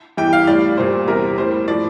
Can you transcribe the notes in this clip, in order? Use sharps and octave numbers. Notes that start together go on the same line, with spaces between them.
E2 E3 G3 G5
F5
A2 G3 D5
A#2 G3 C5
E2 C3 G3 A#4
A2 G3 C5
A2 F3 D5